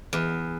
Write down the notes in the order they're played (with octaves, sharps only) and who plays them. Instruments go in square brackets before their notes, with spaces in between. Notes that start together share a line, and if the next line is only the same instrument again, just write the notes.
[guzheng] E2